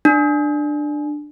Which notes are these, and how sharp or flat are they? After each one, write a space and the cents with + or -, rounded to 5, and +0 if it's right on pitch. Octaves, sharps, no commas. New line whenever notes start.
D4 +15